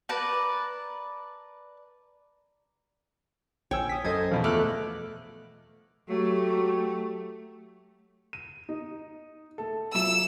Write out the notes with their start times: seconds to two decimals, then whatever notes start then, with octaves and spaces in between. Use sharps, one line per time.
0.09 A#4 B4 D5 A5
3.71 A#1 C#5 G5 G#5 E6
3.89 D#6 B6
4.04 F#2 A4 C5 D#5 G#6
4.31 E2 B2 F3
4.44 A3 D6 F6 F#6
6.09 F#3 A3 G4
8.33 D#7
8.69 D#4
9.58 A3 A4
9.95 F#3 F4 E5 E6